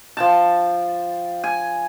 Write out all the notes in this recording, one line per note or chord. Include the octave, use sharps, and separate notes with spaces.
F3 G5 A5
G#5